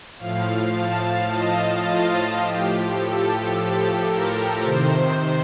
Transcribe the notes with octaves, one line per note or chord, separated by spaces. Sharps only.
A2 F3 F5
A5
D#5
F4
A2 F3 G4
A4
A4
A#4
C3 D#3 C5